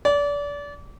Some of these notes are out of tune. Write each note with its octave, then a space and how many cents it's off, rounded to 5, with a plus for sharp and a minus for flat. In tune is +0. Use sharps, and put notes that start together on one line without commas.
D5 -30